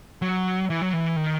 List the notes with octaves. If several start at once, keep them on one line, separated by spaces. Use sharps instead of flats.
F#3
E3
F#3
E3
D#3